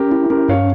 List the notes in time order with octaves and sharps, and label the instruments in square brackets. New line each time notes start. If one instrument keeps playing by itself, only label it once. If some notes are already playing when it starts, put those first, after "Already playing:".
Already playing: [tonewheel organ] C#4 [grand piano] G4 A#4
[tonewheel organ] E4
[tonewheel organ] C#4 [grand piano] G4 A#4
[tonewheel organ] G2 [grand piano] C#5 F5